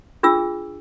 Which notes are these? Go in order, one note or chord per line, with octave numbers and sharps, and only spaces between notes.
D4 F4 G#4 E6